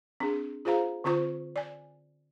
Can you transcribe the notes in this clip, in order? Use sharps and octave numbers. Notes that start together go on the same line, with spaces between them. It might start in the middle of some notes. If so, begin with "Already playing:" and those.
C4 D4 G#4
F4 G#4 C5 F5 A#5
D3 C4 F4 C5 C#6
D5 G#5